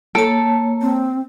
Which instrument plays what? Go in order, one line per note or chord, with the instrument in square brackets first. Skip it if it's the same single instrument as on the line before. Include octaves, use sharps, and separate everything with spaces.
[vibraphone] A#3 C#5 A5 [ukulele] A4
[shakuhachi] C4